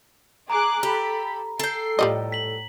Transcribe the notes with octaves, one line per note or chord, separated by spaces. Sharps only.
G#4 A#5 D6 F#6
G4 A4 B5
A4 G5 C7
A2 F3 G3 D#5
B6 F#7